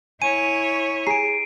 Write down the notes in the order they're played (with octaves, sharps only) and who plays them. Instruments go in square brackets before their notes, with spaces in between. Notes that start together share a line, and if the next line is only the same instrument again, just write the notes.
[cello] E4 C#5 [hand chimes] G#5 [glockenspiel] D#7
[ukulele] G#4 [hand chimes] A#5 [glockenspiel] C7 D7